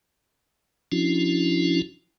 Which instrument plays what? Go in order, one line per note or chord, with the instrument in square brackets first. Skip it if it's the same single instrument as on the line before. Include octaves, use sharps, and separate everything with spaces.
[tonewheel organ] F3 C#4 D4 E4 F#4